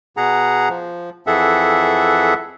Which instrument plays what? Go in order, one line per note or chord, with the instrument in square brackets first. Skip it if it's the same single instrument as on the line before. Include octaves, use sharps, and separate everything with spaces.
[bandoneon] B2 G#4 F#5 A#5
F3
F2 E3 G#4 A4 E5 F#5